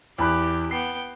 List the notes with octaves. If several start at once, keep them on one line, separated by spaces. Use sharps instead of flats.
E2 G4 B5 F#6
B3 G5 C7